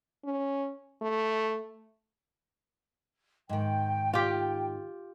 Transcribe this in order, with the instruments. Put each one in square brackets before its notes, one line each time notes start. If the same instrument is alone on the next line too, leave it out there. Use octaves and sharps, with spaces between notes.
[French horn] C#4
A3
[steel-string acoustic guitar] G#2 D#3 [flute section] G5
[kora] F4 G4